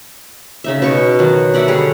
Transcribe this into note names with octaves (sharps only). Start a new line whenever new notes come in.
C#3 D#4 E5
B2 C#6
D#3 F#3
D4 D5 E5 F#5
D3 G3 G#4 C#5